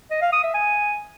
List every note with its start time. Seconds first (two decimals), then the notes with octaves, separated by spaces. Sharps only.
0.11 D#5
0.21 F5
0.32 D#6
0.43 E5
0.54 G#5